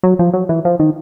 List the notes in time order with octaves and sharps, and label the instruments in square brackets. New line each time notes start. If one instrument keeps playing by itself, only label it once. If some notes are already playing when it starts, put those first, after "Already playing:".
[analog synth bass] F#3
F3
F#3
E3
F3
D#3